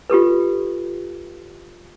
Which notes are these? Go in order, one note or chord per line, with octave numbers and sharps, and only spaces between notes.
F4 G4 A4 B4